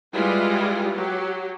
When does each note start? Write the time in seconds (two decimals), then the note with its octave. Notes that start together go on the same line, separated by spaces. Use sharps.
0.13 G3 G#3 E4 F4 G#4 B4
0.93 F#3 G4